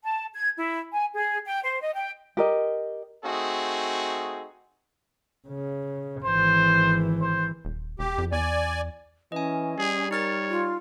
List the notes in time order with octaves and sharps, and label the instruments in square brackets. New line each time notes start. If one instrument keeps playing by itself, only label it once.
[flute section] A5
G#6
E4
G#5
G#4
G5
C5
D#5
G5
[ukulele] G4 A#4 D#5
[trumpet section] A3 C4 D#4 F#4 G#4
[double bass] C#3
[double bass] G#1 E3 [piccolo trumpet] C5
[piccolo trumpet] C5
[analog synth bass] D#1
[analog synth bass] E1 [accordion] G4
[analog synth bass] F2
[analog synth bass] E2 [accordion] D5 G#5
[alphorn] E3 [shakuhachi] C#4 [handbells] D#5 G#5
[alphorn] G3 [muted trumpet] G#4
[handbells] D#4 F6 A6 [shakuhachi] A#4 [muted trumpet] C#5
[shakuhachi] F4